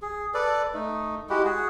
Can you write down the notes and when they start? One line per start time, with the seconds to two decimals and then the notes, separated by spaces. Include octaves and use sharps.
0.02 G#4
0.34 A4 B4 D5
0.74 A3 D#4
1.30 G#3 E4 F#4 G4
1.45 F#4 G#4